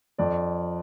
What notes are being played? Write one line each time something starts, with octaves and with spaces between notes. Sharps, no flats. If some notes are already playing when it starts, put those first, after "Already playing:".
F2 D5